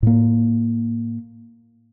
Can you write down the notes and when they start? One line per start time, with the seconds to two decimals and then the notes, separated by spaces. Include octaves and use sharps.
0.03 A2 A#3